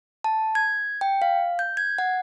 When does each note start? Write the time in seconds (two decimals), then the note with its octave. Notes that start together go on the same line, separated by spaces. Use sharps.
0.24 A5
0.55 G#6
1.01 G5
1.22 F5
1.59 G6
1.77 G#6
1.98 F#5